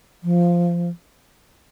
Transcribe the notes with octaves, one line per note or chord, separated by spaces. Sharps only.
F3